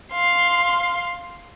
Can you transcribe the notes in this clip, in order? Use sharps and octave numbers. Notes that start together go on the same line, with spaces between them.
F5 C6